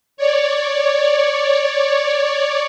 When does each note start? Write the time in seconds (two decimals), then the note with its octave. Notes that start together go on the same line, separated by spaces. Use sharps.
0.17 C#5 D5